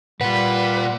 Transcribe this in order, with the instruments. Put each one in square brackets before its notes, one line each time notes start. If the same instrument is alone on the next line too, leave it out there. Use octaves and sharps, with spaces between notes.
[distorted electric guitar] A#2 F4 [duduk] G3 [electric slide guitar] B4 [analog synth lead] F#5